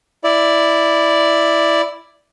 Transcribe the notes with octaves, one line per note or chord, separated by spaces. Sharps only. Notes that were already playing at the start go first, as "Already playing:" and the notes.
E4 D5